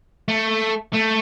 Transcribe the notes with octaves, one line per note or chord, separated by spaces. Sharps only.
A3
A3